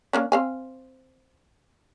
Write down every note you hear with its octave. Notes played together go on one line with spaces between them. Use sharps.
A#3 C#4 D4
C4 F5 G#5